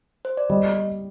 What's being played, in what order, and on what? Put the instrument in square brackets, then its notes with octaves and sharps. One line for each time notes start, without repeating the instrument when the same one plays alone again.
[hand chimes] C5
D5
[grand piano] G3 [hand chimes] D#5